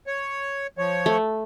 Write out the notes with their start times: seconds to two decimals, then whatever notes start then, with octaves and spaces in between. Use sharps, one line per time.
0.07 C#5
0.78 F3 C#5
1.06 A3